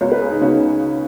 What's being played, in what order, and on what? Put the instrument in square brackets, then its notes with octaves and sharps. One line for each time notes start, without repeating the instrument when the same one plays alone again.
[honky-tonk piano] C#2 C#3 B3 F#4 [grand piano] C#5
[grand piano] B4
G#4
D#4
[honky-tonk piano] C#2 C#3 B3 F#4 [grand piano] C#4